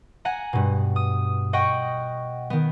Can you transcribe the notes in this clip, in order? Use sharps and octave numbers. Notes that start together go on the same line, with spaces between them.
F#5 G#5 A#5
G2 B2
D#6
D#5 F#5 G5 C#6
D#3 B3